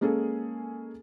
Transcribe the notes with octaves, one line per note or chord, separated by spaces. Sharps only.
G#3 A#3 C#4 G#4 A4